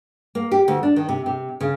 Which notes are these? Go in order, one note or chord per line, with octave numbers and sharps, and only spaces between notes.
A#3
G4
D2
D4
D#3
C3
C3
C#3